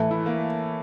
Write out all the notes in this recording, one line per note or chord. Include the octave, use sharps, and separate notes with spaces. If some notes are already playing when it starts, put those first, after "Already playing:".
Already playing: A2 E3 A3
E4
A#3